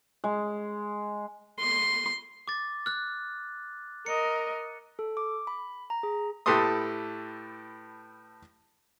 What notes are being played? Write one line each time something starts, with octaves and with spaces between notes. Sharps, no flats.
G#3
C6
D6 A6
F6 F#6
A#4 D#5 C#7
A4
D6
B5
A#5
G#4
A2 G4 A4 B4 C6 D#6